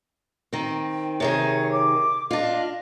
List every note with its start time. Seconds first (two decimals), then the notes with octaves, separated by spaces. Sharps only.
0.53 D#3 C4
1.20 C3 D#3 G#4 C#5
1.72 D6
2.31 D4 F4 D#5